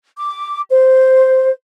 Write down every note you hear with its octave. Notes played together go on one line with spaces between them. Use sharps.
D6
C5